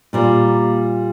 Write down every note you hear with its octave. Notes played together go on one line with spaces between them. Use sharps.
A#2 G3 A#3